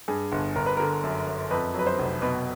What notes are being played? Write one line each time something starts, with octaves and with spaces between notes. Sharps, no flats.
G2 G#4
G1
G1 A#4
B4
D3 A#4
F#2
F#2
F2 B4
F#3 B4
C5
F1
B2 B4